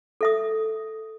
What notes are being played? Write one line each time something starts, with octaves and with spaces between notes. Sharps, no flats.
A4 E5 D#6